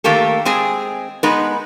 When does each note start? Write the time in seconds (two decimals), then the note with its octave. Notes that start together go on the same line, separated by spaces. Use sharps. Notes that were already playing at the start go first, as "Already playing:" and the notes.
0.04 D#3 A3 A#3 G4 A4
0.45 G#3 C4 G#4
1.23 G#3 B3 D#4 B4